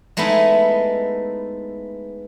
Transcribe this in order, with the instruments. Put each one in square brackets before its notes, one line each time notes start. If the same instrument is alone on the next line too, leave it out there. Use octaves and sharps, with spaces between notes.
[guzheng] G#3 A3 B3 D#4 E4